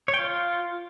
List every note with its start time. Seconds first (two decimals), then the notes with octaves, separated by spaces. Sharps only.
0.08 C#5
0.14 G5
0.19 F4